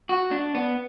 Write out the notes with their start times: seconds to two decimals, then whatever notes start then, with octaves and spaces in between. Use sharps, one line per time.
0.09 F#4
0.31 D4
0.55 B3